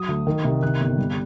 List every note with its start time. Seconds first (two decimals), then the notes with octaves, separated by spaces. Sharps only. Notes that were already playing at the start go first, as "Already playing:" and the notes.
Already playing: F#3 D#6
0.08 D2
0.27 D#3
0.44 C2
0.62 D#3 F#6
0.80 G1
0.98 G3